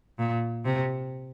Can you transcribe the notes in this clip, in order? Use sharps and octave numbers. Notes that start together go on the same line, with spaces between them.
A#2
C3